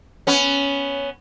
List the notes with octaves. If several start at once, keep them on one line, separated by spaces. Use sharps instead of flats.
B3 C#4